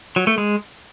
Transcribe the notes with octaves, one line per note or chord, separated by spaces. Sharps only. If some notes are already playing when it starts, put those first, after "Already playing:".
F#3
A3
G#3